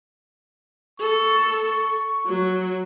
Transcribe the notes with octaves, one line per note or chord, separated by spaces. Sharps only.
A4 C#6
F#3